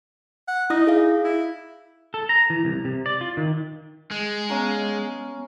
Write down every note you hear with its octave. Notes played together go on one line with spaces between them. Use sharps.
F#5
D#4 E4 D#6 A#6
G#4 F5
E4
A4
A#5
E3
C2
C3
D5
F4
D#3
G#3
B3 C#4 F5 A#5